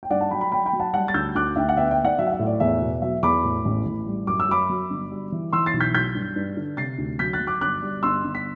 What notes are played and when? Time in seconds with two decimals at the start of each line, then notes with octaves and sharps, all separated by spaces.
0.03 G5
0.11 G2 D5 F#5
0.21 F#5 A5
0.31 F#3 G5 B5
0.41 G5 B5
0.52 F#3 G5 B5
0.65 G5 B5
0.73 F#3
0.80 F#5 A5
0.94 G3 F#5 A5
1.08 A6
1.14 D2 E6 G6
1.35 D2 D6 F#6
1.56 D2 E5 G5
1.69 F#5
1.77 B3 E5 G5
1.91 E5 G5
1.98 B3
2.05 D5 F#5
2.19 F#3 E5
2.27 F#5
2.32 E5
2.39 A2
2.46 D5
2.60 E2 E5
2.81 B2
3.02 F#3 E5
3.23 E2 B5 D6
3.44 A2
3.65 A1
3.86 A1
4.07 G3
4.27 F#2 D6
4.40 E6
4.49 F#2 B5 D6
4.69 F#3
4.90 G1
5.11 G3
5.32 E3
5.53 E3 C6 E6
5.66 A6 C7
5.74 B1
5.80 G6 B6
5.94 F#3 G6 B6
6.15 G2
6.36 G2
6.57 D3
6.77 C3 A6 C7
6.98 D2
7.19 F#3 G6 B6
7.33 F#6 A6
7.40 F#3
7.47 D6 F#6
7.61 G1 D6 F#6
7.82 G3
8.03 G1 C6 E6
8.24 G1
8.35 B6